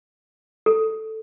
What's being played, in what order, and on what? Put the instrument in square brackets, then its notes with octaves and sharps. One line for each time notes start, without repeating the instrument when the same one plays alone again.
[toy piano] A4